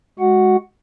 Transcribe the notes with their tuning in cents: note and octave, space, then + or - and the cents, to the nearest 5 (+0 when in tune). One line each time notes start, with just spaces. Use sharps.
G#3 +0 F#4 +0 F#5 +0